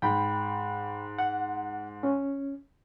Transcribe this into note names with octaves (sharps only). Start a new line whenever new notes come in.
G#2 G5 B5
F#5
C#4